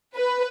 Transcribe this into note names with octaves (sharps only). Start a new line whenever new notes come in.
B4